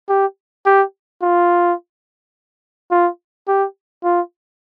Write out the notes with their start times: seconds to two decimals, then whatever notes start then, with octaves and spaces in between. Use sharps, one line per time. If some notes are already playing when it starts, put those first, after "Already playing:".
0.09 G4
0.66 G4
1.22 F4
2.91 F4
3.48 G4
4.04 F4